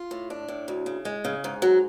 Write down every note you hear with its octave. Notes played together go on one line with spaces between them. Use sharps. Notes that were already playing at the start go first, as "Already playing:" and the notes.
Already playing: F4
A2
D4
A2
D2
C#3
G#3
C#3
G#2
F#3